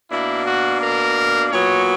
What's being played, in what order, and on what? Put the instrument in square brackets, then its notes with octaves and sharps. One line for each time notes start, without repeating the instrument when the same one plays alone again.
[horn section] B2 A#3 D4 E4
F#4
A#4
A#2 F#3 B3 C#5